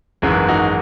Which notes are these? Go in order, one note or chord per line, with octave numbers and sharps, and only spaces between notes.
G#1 F#2 E3 G#3
D#4 F#4